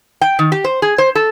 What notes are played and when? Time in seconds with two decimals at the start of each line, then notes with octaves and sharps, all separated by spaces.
0.21 G5
0.39 D#3
0.52 G4
0.64 C5
0.82 G#4
0.98 C5
1.15 A4